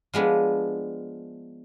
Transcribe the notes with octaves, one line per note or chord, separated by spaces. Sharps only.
F3 G#3 B3 D4